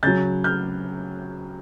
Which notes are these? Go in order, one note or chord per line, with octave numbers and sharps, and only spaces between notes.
C#3 F#3 G6 A6
F6 G6